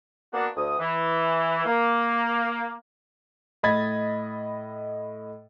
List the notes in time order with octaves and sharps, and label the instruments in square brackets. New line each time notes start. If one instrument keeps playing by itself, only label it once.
[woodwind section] A#3 B3 D4 F#4
D2 D#6
E3
A#3
[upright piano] A2 D#5 B5 G#6 A6